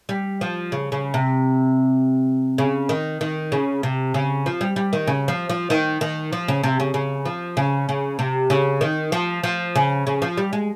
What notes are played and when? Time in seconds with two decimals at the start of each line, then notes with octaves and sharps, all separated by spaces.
0.09 G3
0.41 F3
0.72 C#3
0.92 C#3
1.14 C3
2.58 C#3
2.89 D#3
3.21 D#3
3.52 C#3
3.83 C3
4.14 C#3
4.46 F3
4.61 G3
4.76 G3
4.93 D#3
5.07 C#3
5.28 F3
5.49 F3
5.70 D#3
6.01 D#3
6.33 F3
6.48 C#3
6.63 C3
6.80 C#3
6.94 C#3
7.25 F3
7.57 C#3
7.89 C#3
8.19 C3
8.50 C#3
8.81 D#3
9.12 F3
9.44 F3
9.75 C#3
10.07 C#3
10.22 F3
10.37 G3
10.53 G#3